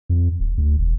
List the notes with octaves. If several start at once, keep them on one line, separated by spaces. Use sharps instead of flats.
F2
D1
D2
E1